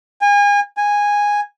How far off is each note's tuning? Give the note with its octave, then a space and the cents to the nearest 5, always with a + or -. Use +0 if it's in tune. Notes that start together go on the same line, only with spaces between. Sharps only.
G#5 -35
G#5 -10